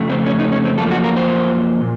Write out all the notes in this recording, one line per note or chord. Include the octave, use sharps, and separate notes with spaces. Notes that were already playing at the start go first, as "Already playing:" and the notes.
Already playing: F2 C#3 A3
C4
C#4
D#4
C#4
C4
F#2 F3 A#3 A4
F#4
A#4
C5
A#2